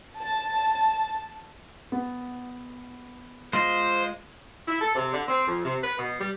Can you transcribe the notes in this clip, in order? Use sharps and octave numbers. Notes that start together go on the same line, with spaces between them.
A5
B3
G#3 F4 C5 D#5
E4
A4
C3
D3
C4
F2
C3
B4
B2
G3